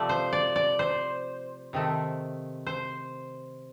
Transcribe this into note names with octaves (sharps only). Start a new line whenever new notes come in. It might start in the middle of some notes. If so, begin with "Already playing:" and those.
Already playing: C3 F3 A3 D5
C5
D5
D5
C5
C3 D#3 A3
C5